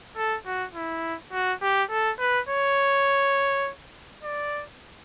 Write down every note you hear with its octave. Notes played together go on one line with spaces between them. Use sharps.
A4
F#4
E4
F#4
G4
A4
B4
C#5
D5